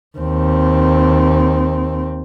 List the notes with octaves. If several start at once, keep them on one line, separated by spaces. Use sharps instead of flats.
D#2 C4